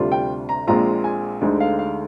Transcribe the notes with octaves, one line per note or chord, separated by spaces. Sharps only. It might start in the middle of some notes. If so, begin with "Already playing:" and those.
Already playing: D2 C3 G3 D4 F4
G5
A#5
A#1 A#2 G#3 C4 F4 A#5
G#5
D2 D3 G#3 D#4
F5
F5